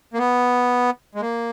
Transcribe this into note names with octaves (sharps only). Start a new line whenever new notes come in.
A#3
B3
G#3
A#3